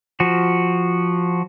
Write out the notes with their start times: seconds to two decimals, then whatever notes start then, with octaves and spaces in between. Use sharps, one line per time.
0.20 F3 F#4